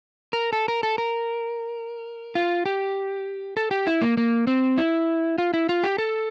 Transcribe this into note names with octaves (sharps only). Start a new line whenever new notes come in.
A#4
A4
A#4
A4
A#4
F4
G4
A4
G4
E4
A#3
A#3
C4
E4
F4
E4
F4
G4
A4